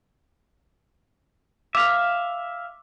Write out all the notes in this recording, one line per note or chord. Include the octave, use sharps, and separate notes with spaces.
E5 F5 D6 B6